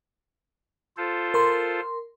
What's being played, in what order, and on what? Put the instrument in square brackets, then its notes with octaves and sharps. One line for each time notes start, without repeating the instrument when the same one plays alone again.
[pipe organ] F4 A4 C5
[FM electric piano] A#4 C6